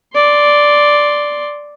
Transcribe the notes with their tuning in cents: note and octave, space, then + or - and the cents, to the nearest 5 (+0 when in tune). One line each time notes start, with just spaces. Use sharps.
D5 +0 C6 +0